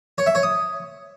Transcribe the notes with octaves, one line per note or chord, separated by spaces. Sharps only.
C#5
E5
C#5
D#6